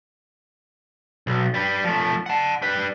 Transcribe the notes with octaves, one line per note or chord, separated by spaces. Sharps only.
B1
G3 B4
F3 A3
F#5 A5
G3 B4